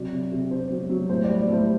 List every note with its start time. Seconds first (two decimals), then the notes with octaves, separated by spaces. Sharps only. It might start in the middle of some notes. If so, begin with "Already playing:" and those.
Already playing: C3 F#3 D5
0.12 C3
0.32 C3
0.50 C3 C5
0.70 F#3
0.89 F#3
1.09 A2 C5
1.24 D5
1.29 G3
1.38 D5
1.48 A2 C5